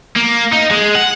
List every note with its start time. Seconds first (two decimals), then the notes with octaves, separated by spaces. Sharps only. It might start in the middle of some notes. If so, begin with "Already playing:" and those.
0.16 A#3
0.53 D#4
0.71 G#3
0.95 F#5